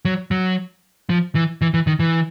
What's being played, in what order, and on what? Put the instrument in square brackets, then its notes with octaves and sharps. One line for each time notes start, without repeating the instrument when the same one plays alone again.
[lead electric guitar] F#3
F#3
F3
E3
E3
E3
D#3
E3